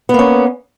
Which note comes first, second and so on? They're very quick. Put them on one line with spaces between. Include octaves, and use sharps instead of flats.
B3 A#3 C#4